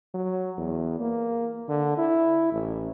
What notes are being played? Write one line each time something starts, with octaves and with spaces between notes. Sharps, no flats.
F#3
E2
A#3
D3
E4
A1